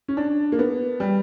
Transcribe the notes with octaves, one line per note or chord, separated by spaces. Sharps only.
C#4
D4
A#3
B3
G3